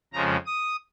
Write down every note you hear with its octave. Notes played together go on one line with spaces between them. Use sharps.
F2 C#3 F3 G#3 A#5
D#6